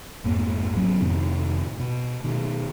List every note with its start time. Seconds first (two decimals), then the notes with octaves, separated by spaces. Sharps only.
0.24 A#1 F2 G#2 A#3
0.75 G#1 F#3 B3 C#4
1.00 F2 A2 C3 D#3
1.80 B2
2.24 B2 D#3